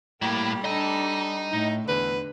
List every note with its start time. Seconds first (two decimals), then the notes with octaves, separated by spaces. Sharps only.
0.22 A2 G3 A#3 E4 G4
0.64 D4 A4 D#5 A#5
1.52 A2 D#4
1.88 E2 D3 B4